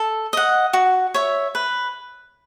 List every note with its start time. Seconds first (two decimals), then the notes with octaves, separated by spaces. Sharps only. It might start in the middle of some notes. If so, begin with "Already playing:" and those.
Already playing: A4
0.33 D#5 F#5
0.73 F#4
1.14 C#5 E5
1.55 B4